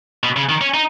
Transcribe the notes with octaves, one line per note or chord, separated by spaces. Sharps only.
B2
C#3
D#3
C#4
D#4